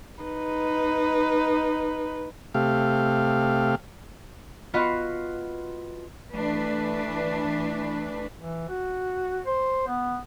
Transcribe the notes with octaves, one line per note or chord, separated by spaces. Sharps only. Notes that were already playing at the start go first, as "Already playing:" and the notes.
D#4 B4
C3 A3 G4 F5
B3 F4 F#4 B4 D#5 F5
E3 A3 D4 B4
E3
F#4
C5
B3